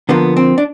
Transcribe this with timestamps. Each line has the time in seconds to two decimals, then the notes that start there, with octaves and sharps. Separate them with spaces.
0.09 D3 F3 A#3 B3
0.36 C4
0.58 D4